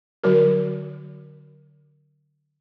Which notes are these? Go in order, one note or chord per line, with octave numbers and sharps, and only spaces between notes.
D3 F#3 F#4 A#4